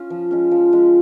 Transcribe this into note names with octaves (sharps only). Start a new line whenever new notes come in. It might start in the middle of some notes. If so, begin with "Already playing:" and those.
Already playing: C#4 F4
F3
G#3 C#4
F3
G#3 C#4